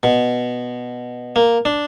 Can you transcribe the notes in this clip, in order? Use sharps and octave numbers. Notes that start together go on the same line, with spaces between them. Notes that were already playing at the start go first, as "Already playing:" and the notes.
B2
A#3
D4